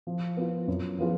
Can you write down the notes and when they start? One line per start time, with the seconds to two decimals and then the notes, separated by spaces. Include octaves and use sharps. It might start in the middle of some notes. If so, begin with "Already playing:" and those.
0.07 F3
0.37 B3 F4
0.68 F#2
0.99 F3 B3 F4 G#4